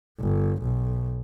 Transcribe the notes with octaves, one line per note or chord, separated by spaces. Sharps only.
G1
B1